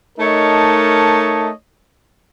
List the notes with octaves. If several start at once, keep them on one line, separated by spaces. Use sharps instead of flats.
A3 D#4 A#4 C#5 D#5 A5